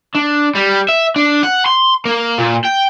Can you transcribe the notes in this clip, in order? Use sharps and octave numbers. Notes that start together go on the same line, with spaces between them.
D4
G3
E5
D4
F#5
C6
A#3
A#2
G5